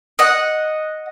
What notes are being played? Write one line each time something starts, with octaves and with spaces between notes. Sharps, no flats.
D#5 F#5